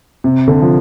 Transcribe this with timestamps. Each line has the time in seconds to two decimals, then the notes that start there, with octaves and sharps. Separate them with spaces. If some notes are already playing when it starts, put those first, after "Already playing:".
0.24 C3
0.48 D3
0.62 F3